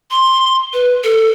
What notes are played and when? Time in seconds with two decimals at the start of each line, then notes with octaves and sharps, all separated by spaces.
0.11 C6
0.73 B4
1.04 A4